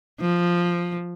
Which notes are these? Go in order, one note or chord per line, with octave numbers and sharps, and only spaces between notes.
F3